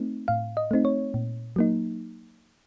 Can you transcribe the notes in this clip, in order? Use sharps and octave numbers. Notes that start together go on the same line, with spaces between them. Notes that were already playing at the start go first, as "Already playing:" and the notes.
Already playing: A3 C4 D#4
A2 F5
D#5
A3 C4 D#4
C#5
A#2
F#3 A#3 D#4